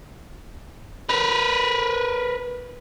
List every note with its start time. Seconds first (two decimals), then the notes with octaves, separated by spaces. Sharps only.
1.10 A#4 B4